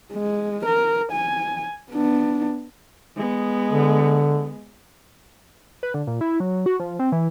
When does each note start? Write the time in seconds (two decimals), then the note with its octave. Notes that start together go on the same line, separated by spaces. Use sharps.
0.13 G#3
0.65 A#4
1.12 G#5
1.91 B3 D4
3.16 G#3 B3
3.72 D3
5.83 B4
5.94 D3
6.07 A#2
6.21 E4
6.40 F#3
6.66 F#4
6.80 F3
6.99 C4
7.12 E3